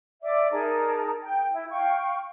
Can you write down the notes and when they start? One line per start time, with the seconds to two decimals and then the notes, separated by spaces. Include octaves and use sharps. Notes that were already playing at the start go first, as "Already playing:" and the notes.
0.23 D5 E5 D6
0.51 D#4 G#4 A#4 A5
1.22 G5
1.52 E4
1.70 F5 G5 C#6